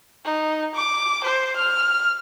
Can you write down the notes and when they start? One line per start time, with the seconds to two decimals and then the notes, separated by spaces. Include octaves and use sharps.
0.25 D#4
0.75 D6
1.24 C5
1.57 F6